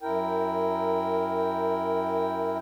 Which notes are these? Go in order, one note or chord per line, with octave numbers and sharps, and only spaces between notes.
F#2 E4 A#4 G5